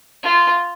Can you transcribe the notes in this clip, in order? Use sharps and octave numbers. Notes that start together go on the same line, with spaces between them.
F4